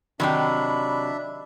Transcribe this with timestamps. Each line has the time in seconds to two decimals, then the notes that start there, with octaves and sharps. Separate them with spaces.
0.20 C3 D#3 F#3 D4 D#4 E5 B5